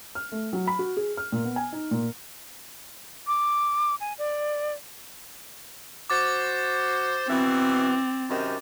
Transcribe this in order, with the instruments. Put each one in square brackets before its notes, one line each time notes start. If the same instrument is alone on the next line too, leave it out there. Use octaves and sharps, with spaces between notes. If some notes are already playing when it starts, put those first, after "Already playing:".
[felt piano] F6
A3
F#3
B5
F#4
G#4
F6
A#2
B3
G#5
D#4
A#2
[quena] D6
G#5
D5
[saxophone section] F#4 C5 [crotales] D6 A6
[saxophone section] B2 E3 [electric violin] C4
[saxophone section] F#2 C3 D#3